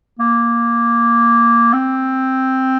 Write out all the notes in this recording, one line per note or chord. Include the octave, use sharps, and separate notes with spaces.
A#3
C4